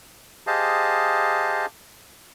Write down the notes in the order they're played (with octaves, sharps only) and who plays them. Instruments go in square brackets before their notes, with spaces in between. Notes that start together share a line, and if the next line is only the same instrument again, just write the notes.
[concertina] G4 G#4 C5 D#5 F5 A5